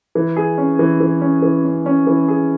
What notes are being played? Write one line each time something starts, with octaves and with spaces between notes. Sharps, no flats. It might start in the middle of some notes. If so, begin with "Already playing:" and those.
E3
G#4
C#4
E3
E3
C#4
E3
C#4
C#4
E3
G#4